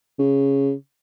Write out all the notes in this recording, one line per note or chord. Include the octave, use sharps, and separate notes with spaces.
C#3